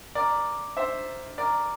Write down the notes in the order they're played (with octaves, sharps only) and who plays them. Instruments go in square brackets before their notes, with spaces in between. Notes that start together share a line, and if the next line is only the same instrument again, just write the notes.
[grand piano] A#4 D5
C5 E5
A#4 D5